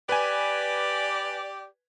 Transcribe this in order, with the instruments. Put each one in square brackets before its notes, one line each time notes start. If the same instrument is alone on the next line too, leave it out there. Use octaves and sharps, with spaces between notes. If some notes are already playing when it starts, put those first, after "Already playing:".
[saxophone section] G4 D5 [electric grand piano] B4 G#5